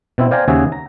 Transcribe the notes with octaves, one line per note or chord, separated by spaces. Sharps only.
B2 C4 E4
C5 D5 F5 G5 G#5 A#5
D#2 C#3 F#4 G#4 E5
A#5